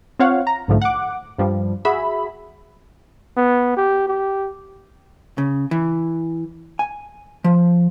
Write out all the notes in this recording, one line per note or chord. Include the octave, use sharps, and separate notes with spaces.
C4 F4 C#5 F5 F#5
A#5
B1 G#2 D3 F3 A3
F#5 D6
G2 F3 G3
F#4 G#4 E5 B5
B3
G4
G4
C#3
E3
G#5
F3